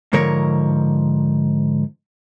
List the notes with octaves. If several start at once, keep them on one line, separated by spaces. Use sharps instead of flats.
G#2 D3 F3 A#4 C#5